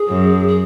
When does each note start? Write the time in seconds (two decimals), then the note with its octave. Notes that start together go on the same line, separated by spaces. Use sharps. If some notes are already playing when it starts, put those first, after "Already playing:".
Already playing: G#4
0.08 F#2
0.47 G#4